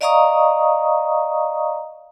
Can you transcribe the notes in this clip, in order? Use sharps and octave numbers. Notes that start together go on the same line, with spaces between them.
D5 D#5 F5 A#5 C#6 D#6